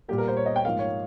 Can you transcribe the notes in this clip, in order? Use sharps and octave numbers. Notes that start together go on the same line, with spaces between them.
A#2 G3 A#3 G4
A#4
C5
C#5
D#5
G5
G#2 F3 A#3 F5
C#5